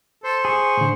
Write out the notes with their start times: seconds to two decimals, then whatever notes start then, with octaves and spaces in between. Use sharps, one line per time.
0.24 A4 C5
0.45 G#4 C#6
0.77 A2 D3